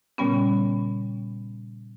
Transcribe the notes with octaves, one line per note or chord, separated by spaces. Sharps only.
A#2 C#3 G3 B3 C#4